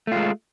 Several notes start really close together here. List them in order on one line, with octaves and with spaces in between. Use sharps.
A3 F4 G#3